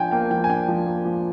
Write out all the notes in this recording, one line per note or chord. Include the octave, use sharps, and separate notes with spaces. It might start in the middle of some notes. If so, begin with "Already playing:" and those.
Already playing: F3 D4 G5 G#5
A#3 G5
F3 G5
G#5
D4 G5
F3
A#3
F3